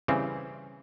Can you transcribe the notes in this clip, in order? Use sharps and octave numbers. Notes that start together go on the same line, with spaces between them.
C#3 E3 G3 C4